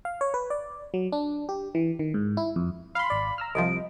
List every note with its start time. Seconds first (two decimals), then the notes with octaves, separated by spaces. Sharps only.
0.05 F5
0.21 C#5
0.34 B4
0.50 D5
0.94 F#3
1.12 D4
1.49 G4
1.75 E3
1.99 D#3
2.14 G#2
2.37 E4
2.56 F2
2.95 F5 B5 C6
3.10 G#1 D5
3.38 A#5 E6 F6
3.55 C2 C3 F3 D#5 D7